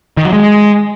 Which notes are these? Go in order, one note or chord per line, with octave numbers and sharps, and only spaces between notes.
D#3
F#3
G#3